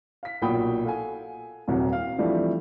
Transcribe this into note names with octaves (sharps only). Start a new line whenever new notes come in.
F5 B6
B1 A#2 F#4 G5 B5 D#6
A4 F5 F#5 G#5
D#1 C2 F#3 C4
F5
E3 F3 G3 A3 C4 D4